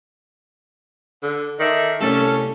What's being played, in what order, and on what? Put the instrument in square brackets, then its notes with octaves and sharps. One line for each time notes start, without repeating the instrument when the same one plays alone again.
[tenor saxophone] D3
[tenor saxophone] D#3 [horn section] A4 D5 E5
[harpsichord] C2 A3 D5 [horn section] C#4 [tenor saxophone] A4